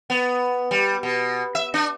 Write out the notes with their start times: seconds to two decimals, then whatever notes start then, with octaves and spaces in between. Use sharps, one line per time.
0.10 B3
0.71 G3
1.03 B2
1.55 E5
1.74 D4